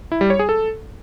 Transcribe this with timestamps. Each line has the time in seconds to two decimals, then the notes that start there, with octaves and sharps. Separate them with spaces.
0.12 E4
0.21 G3
0.30 C#5
0.39 G#4
0.49 A4